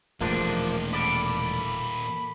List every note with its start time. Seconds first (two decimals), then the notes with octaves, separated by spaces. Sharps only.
0.21 E1 A#2 D#3 F3 A3 A#3 D4
0.93 A#3 A4 D5 B5